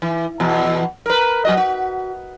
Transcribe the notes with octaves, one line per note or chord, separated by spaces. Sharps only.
E3
E2 B2
A#4 B4
F#3 F#4 D#5
F#4